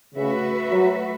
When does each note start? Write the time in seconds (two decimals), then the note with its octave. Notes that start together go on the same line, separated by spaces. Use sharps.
0.15 C#3 A3 F#4 B4 E5
0.71 F#3